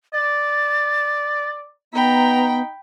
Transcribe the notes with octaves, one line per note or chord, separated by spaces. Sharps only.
D5 A6
B3 D#4 G5 A#5 B5